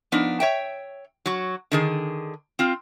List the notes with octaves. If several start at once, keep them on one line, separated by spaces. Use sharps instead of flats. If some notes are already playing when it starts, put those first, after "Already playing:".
F3 B3 D4 D#4
C#5 E5 G5
F#3 F#4
D3 D#3 G#4
C4 F4